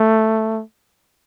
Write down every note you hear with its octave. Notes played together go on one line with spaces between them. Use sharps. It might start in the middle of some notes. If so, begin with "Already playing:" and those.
Already playing: A3